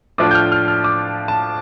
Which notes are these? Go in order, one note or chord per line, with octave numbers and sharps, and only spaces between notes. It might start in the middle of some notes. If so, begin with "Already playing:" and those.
A2 F3 D4 F4 D6
G6
F6
F6
F6
D6
A5